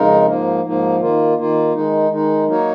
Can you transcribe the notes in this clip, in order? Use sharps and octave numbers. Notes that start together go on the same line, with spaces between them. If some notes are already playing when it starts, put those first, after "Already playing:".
Already playing: F2 C#3 G#3 D#4 A#4
G#2 F3 A#3
G#2 F3 A#3
D#3 A#3 F4
D#3 A#3 F4
D#3 G#3 D#4
D#3 G#3 D#4
F#3 A#3 D#4 A#4 C#5